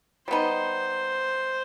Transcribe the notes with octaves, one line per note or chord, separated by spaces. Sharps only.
G3 B3 D#4 C5